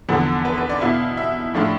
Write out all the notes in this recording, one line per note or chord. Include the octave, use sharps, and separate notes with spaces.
E2 D3 F3 B3 A4
B4
B4
D5
B2 B3 E4 F5
E5
A2 F3 A3 D4 F4